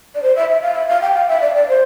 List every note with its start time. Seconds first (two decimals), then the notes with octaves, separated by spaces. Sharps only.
0.15 D5
0.22 C5
0.36 E5
0.49 E5
0.62 F5
0.75 E5
0.88 F5
1.02 G5
1.15 F5
1.28 E5
1.41 D5
1.55 D5
1.68 C5